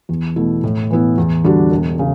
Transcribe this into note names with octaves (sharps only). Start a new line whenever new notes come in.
E2
B2 A3 E4
A2
E3 B3 E4
E2
D3 G3 D4 F#4
E1
C#3